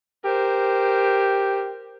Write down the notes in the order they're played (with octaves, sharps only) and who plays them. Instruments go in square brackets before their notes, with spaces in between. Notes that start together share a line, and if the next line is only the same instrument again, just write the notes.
[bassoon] G4 [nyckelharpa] A#4 C5